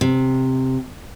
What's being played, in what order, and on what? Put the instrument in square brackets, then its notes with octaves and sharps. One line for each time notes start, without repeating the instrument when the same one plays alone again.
[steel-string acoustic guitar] C3